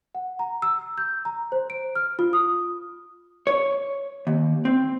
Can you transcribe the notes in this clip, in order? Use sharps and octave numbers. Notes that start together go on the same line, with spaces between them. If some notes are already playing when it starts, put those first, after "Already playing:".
F#5
A#5
E6
G6
A#5
C5
D7
F6
F4
D#6
C#5
D#2
C4